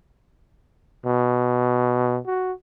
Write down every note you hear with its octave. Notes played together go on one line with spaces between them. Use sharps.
B2
F#4